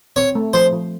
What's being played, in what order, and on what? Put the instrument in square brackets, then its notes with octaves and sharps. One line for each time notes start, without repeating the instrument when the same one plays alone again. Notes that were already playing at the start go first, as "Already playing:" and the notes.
[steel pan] C4 [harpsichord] C#5
[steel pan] A3
[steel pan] F3 [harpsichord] C5
[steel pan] F3